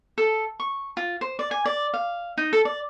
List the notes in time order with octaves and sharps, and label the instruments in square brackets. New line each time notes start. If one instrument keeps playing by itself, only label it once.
[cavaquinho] A4
C#6
F4
C5
D5
G#5
D5
F5
D#4
A4
D5